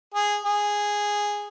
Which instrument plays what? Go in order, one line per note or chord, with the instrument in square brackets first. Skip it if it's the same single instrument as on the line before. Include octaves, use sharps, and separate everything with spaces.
[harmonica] G#4
G#4